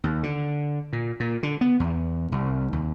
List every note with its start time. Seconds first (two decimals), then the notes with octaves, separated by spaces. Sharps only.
0.04 D#2
0.23 D3
0.93 A#2
1.20 A#2
1.43 D3
1.61 B3
1.80 E2
2.32 C2
2.73 D#2